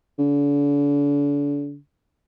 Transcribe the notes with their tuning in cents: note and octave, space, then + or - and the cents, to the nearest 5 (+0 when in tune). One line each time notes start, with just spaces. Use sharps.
D3 -40